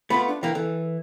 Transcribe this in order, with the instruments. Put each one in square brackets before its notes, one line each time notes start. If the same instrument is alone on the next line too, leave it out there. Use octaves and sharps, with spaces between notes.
[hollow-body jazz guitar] A3 B3 F4 [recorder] B5
[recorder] D4
[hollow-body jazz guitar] E3 A#3 [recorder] G5
[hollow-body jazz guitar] E3 [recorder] A4